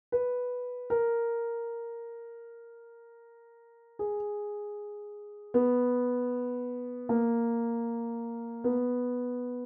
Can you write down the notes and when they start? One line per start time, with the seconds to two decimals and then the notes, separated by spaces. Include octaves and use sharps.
0.12 B4
0.90 A#4
3.99 G#4
5.54 B3
7.09 A#3
8.64 B3